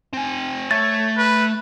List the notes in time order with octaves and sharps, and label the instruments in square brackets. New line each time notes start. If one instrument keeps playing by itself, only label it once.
[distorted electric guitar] C4 G#5
[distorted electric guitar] A3 [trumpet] C#5 [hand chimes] A6
[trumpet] B4